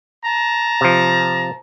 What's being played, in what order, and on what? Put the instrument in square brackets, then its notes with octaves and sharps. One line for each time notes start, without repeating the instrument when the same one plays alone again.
[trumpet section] A5 A#5
[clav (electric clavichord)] C3 F3